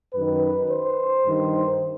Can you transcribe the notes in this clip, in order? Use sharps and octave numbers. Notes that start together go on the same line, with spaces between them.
F#2 D#3 B4
C5
G2 D#3